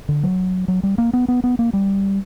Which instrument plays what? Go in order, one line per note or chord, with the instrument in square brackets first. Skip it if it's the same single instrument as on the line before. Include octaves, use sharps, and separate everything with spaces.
[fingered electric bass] D3
F#3
F#3
G3
A#3
B3
B3
B3
A#3
G3